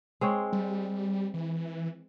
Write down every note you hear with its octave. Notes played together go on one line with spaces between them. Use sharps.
G#3 C4 C#5
G3
E3